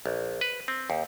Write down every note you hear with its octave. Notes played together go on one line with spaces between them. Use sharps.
A#1
B4
C4
D#2